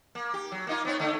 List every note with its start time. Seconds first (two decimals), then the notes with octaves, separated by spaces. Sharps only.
0.15 A#3
0.34 G4
0.52 F#3
0.67 A#3 D#4 F4
0.85 B3 C4 C#5
0.99 D3 A3 D#4